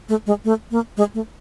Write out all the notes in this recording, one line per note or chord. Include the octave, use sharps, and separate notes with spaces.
A3
G#3
A3
A#3
G#3
A3